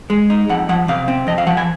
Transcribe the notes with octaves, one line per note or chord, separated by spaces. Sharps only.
G#3
D#4
F2 F#5
F3 F#5
C3 F5
C4
F2 D#5
F5
F3 F#5
G#5